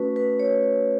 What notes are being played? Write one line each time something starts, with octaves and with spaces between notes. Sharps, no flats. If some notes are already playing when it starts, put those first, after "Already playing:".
Already playing: A3 C#4 F#4 B4
B4
C#5